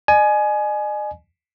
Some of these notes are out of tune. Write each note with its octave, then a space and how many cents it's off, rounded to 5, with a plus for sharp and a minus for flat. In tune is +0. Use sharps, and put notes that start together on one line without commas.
D#5 -45 G#5 +20